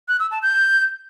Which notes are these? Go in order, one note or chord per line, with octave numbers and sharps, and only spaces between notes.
F#6
E6
A5
G6